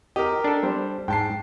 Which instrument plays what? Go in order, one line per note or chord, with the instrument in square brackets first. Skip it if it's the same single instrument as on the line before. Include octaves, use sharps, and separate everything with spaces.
[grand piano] G4 A#4 [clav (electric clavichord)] D#5
[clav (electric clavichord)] D4 A4
[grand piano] G3 C5
[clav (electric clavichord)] G#2 [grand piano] G5 A5 C7